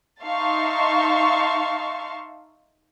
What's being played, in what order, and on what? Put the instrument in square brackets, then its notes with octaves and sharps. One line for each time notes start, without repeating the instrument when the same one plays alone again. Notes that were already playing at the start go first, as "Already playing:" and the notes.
[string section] D#4 E5 F5 A5 C6 C#6